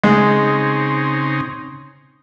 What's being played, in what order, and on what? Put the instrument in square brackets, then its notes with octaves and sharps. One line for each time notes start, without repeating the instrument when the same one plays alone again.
[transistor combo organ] C#3 C4 D#4 [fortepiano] G#3